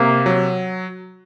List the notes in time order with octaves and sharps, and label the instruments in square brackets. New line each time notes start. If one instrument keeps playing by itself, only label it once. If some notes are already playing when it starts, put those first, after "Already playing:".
Already playing: [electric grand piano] C3 [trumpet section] A#3
[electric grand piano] F#3